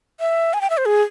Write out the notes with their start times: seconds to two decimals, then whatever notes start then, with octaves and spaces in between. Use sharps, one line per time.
0.20 E5
0.54 G#5
0.61 G5
0.70 E5
0.77 C5
0.86 G#4